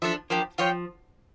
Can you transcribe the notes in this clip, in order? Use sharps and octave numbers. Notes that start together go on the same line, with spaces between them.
F3 D4 A4 E5
F3 A#3 D4 G4
F3 F4 C#5 G5